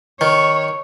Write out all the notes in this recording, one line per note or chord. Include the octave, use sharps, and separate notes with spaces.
D#3 C#5